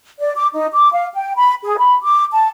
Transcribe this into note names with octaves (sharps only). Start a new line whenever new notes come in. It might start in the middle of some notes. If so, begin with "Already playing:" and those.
D5
D6
D#4
D6
F5
G5
B5
G#4
B5
D6
A5